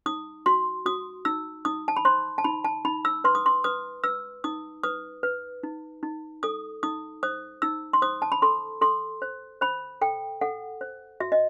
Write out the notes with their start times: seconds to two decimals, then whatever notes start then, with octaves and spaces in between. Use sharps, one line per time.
0.06 D#4 D#6
0.46 F#4 C6
0.86 F#4 D#6
1.25 D#4 E6
1.65 D#4 D#6
1.88 A5
1.97 B5
2.05 C5 C6
2.38 A5
2.44 D#4 B5
2.65 A5
2.85 D#4 B5
3.05 E6
3.24 B4 C6
3.35 D#6
3.46 C6
3.64 B4 D#6
4.04 B4 E6
4.44 D#4 D#6
4.83 B4 D#6
5.23 B4
5.63 D#4
6.03 D#4
6.43 A4 D#6
6.83 D#4 D#6
7.23 C5 D#6
7.62 D#4 E6
7.93 C6
8.02 C5 D#6
8.22 A5
8.32 B5
8.42 A4 C6
8.81 A4 C6
9.22 C5
9.61 C5 B5
10.01 A4 G5
10.41 A4 F#5
10.81 C5
11.20 F#4 E5
11.32 D#5